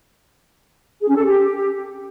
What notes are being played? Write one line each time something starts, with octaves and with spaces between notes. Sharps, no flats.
G#4
C#4
A4
G4